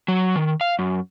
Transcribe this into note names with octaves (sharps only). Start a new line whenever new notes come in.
F#3
D#3
F5
F#2